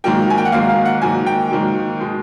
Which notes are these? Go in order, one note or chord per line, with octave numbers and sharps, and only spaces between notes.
G#2 D#3 F#3 A#3 G5
G#5
G5
F#5
G#2 D#3 F#3 A#3 F5
F5
F#5
G#2 D#3 F#3 A#3 G#5
G5
G#2 D#3 F#3 A#3
B2 G#3